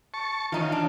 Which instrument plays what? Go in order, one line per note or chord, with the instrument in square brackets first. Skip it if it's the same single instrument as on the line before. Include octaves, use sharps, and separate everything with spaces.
[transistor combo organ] A5 C#6
[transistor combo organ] D#3 F4 [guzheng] E3 D#4 C#5
[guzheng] D4